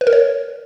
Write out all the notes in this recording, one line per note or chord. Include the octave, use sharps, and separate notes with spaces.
B4
A#4
C#5